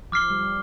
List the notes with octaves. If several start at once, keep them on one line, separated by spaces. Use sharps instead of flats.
F3 D6 F6 C7 G7
G3